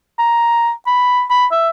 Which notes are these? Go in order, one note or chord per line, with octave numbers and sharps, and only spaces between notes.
A#5
B5
B5
E5